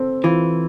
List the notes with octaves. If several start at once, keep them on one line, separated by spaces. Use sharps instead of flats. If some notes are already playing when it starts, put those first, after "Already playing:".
Already playing: C4 A4
E3 F4